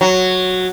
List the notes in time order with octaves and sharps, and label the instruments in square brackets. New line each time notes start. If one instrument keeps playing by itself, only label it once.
[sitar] F#3